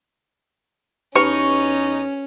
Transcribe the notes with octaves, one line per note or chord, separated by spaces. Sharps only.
E2 C#4 D#4 G4 B4 B5 C#6